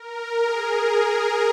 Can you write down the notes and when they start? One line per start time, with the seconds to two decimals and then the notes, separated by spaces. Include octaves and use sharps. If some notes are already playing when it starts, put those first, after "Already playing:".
Already playing: A#4
0.44 G#4